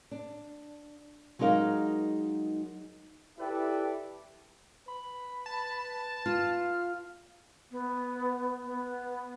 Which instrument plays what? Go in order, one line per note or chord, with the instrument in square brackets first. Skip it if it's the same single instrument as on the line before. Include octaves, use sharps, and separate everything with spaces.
[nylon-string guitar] D4
F#3 G#3 D#4 A#4 F5
[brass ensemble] E4 G4 A4 B4 D5 E5
[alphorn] B4 [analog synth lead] B5
[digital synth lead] A5
[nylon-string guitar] F4 [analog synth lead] F6
[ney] B3
B3